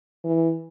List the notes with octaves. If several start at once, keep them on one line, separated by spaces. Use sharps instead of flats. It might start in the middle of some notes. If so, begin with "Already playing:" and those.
E3